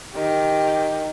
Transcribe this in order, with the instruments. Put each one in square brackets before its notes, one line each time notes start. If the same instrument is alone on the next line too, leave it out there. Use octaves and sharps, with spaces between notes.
[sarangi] D#3 [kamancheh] G4